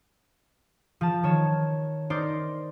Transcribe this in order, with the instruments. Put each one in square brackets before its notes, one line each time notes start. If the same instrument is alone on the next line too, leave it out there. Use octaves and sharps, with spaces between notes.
[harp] F3 A5
D#3 C#5 E7
D#4 A#4 C5 D5